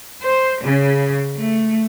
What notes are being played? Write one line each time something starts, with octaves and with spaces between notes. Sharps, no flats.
C5
C#3
A3